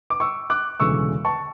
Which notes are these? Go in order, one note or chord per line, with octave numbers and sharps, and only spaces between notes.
D6
C#6 E6
D6 F#6
E1 D2 C#3 E3 A3 C#6 E6
A5 C#6